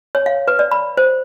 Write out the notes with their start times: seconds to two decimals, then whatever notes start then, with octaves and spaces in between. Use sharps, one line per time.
0.15 C#5
0.26 F5
0.48 B4
0.59 D5
0.71 B5
0.97 C5